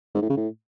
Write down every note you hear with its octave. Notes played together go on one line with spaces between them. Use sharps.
G#2
A2
C#3
A2